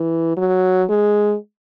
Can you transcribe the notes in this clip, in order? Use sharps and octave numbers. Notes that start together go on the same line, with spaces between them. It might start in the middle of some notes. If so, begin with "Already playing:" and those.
Already playing: E3
F#3
G#3